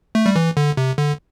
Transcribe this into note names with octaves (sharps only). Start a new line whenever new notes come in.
A3
G3
E3
D3
C3
D3